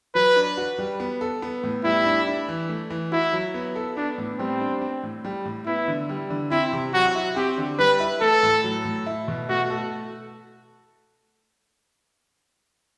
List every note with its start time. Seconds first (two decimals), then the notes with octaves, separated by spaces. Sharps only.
0.15 F#3 B4
0.36 D4
0.57 F#4
0.78 G3
1.00 B3
1.21 A4
1.42 B3
1.63 A2
1.85 G3 E4
2.06 D4
2.27 D4
2.48 E3
2.69 A3
2.90 E3
3.12 E4 F#4
3.33 F#3
3.54 B3
3.76 A4
3.97 B3 D4
4.18 A2
4.39 G3 C4
4.61 D4
4.81 C4
5.03 A2
5.25 G3
5.45 A2
5.66 B3 E4
5.88 D3
6.09 G3
6.30 D3
6.51 C4 E4
6.73 C3
6.94 F#3 F#4
7.15 E4
7.36 C4 G4
7.58 D3
7.79 G3 B4
8.00 E4
8.21 A3 A4
8.43 A2
8.64 F#3
8.85 A2
9.06 E4
9.28 B2
9.49 A3 F#4
9.70 A4